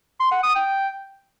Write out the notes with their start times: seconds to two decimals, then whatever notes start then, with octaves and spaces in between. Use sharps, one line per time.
0.20 C6
0.32 F#5
0.43 D#6
0.55 G5